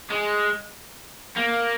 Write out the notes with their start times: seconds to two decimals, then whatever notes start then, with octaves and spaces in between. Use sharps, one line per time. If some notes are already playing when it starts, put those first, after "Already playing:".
0.10 G#3
1.37 A#3